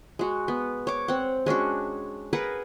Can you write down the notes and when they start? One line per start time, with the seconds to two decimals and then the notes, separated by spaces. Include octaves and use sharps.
0.19 G#3 F#4
0.48 B3
0.87 C#5 D6
1.08 C4 F#5
1.46 G#3 C#4 D4 F#4
2.33 G#4 A#4 B4 F#5